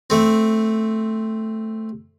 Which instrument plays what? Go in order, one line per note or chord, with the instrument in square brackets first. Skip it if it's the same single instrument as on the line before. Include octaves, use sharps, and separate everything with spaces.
[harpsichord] A3 C4